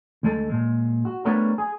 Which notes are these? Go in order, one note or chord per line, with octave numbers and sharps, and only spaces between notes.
D2 G#3 A4
A#2 G#3
F#4
G3 A3 B3 D4 A#4 C#5
G#4